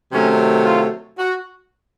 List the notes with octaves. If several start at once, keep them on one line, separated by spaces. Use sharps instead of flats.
C3 D#3 F#3 A3 C#4
F4
F#4